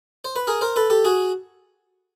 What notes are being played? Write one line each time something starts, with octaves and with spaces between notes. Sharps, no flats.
C5
B4
G#4 A#4
A#4 C5
A4 B4
G4 A4
F#4 G#4